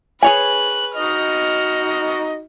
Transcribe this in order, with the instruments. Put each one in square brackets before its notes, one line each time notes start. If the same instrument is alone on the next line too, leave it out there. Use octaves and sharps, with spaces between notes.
[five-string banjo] G#4 C#5 G#5 [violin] B4 F#6
[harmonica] D#4 F#4 D#5 [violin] F6